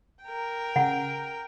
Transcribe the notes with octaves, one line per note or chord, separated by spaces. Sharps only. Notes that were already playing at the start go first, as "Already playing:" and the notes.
A#4 G5
C#3 F#5